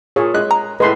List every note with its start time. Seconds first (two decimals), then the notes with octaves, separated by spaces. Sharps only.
0.16 A#2 G#4 C#5
0.34 G#3 F#6
0.51 A#5
0.80 A2 G#3 B4 C6